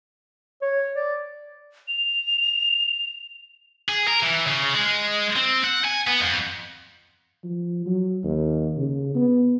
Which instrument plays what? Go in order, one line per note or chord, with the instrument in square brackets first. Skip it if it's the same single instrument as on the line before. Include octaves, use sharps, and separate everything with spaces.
[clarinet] C#5
D5
[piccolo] F7
[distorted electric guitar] G#4
A#4
E3
C#3
G#3
C4
F#5
G#5
B3
F2
[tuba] F3
F#3
D#2
C#3
B3